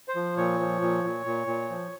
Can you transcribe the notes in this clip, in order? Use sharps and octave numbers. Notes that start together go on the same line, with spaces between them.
C5
F3
A#2 C#5
F3
A#2
A#2
A#2
A#2
F3